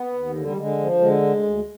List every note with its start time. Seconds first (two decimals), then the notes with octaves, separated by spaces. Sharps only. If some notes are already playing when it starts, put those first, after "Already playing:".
Already playing: B3
0.13 D#2
0.36 D3
0.45 G3
0.57 D3 G#3
0.78 F3
1.00 D3 G#3
1.22 D2
1.43 D2